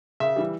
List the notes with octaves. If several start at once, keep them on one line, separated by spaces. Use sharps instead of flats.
C#3 E5
E3 G3